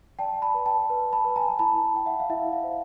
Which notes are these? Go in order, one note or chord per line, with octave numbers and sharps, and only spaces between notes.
D5 G5 A5
A5 B5
B4
G5 A5
B4
A5 B5
B4
G#5 A#5
E4 A5 B5
E4 G5
E5 F#5
F5
E4 E5
F5
C5